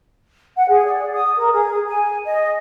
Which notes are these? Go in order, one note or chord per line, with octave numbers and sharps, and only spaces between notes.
F#5
G#4
D5
D#6
A#4
G#4
G#5
D#5